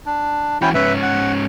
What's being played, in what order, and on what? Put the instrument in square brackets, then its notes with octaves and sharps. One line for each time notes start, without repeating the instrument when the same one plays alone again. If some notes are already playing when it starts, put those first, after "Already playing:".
[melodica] D4
[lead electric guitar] E3 F#4 [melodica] C#4 E4 G5
[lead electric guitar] G#2 C#4 [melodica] B4 E5
[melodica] F#5